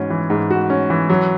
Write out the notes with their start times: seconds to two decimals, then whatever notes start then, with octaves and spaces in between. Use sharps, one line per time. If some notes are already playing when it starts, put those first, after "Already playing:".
Already playing: G#2 E3 C#4 F#4
0.10 E3
0.30 G#2
0.50 F#4
0.70 C#4
0.90 E3
1.10 F#3